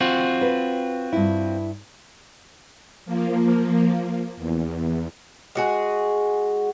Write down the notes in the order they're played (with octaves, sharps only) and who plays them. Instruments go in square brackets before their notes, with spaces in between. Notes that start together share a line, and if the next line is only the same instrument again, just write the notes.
[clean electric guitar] C4 F4 F#4
[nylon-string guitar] B4
G2 E4
[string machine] F3 A#3
E2
[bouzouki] G#3 F#4 G#4